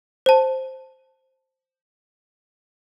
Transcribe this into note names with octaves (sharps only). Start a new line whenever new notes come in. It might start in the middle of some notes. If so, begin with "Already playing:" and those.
C5 A5